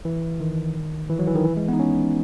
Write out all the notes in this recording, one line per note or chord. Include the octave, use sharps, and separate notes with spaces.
E3
D#3
E3
F#3
E3
D#3
E3
G#3
B3
D#4
C#4